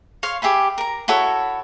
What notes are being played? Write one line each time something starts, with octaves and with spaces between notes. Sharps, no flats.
C#5 F5 C6
G4 G#4 E5 B5
A#4 A#5
E4 F#4 A4 C#5